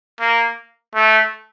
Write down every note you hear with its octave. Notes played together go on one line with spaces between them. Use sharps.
A#3
A3